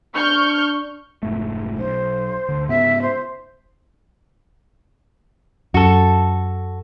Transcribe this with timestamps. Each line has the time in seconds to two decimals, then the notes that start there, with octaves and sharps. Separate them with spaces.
0.16 D4 C#6 F6 G6
1.23 F1 G#2 A3
1.78 B1 C5
2.49 D2 D3
2.69 G#2 C#3 B3 E5
3.02 C5
5.74 F#2 F#4 A4